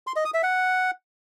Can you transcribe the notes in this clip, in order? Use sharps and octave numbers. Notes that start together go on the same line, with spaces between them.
C6
D#5
D#6
E5
F#5